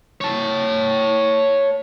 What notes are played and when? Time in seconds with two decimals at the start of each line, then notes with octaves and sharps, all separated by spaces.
0.21 C#5 A5